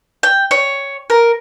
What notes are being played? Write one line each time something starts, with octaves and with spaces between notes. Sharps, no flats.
G5
C#5
A#4